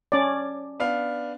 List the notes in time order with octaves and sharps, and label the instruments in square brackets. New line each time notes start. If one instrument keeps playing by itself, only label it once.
[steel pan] C#4 D5
[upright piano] B3 D4 F5